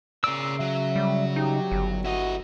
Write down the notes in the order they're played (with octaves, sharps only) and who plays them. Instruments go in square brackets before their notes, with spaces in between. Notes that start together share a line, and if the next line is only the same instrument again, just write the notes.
[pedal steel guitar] C#3 E6 [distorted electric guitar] A#4 D5
[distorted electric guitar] F#3 [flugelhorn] E5
[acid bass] G3
[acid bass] D#4 [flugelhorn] G4
[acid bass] G1
[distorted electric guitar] E4 D#5 [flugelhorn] F#4